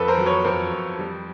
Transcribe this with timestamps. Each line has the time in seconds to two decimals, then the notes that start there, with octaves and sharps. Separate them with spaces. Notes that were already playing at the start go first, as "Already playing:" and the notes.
Already playing: F2 A4 B4
0.08 A#4 C5
0.18 F#3
0.26 B4 C#5
0.44 F2 A#4 C5
0.72 F2
0.99 G3